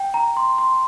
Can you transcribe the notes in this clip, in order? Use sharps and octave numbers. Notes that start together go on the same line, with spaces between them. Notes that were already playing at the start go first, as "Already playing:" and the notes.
Already playing: G5
A#5
C6
C6